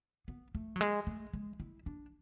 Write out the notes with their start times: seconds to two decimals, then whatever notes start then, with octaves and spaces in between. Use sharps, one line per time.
0.28 B3
0.55 A3
0.76 F#3
0.81 G#3
1.07 A3
1.33 G#3
1.60 E4
1.86 D4